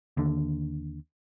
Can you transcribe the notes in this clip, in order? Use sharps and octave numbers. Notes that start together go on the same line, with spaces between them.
D#2 D3